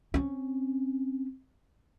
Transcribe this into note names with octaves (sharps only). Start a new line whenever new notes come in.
C4 C#4